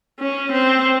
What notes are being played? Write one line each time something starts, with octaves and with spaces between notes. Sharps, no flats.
C#4
C4